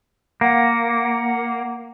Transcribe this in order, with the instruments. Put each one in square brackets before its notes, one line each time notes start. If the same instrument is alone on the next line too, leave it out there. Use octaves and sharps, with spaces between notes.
[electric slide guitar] A#3 [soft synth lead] F#5